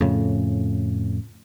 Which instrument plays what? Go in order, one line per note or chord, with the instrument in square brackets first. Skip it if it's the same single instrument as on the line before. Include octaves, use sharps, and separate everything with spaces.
[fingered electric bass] F2 A2 C#3